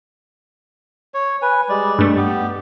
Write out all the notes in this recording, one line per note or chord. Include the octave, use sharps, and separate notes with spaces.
C#5
B4 G#5
G3 G#3 D5
G2 A3
B3 G4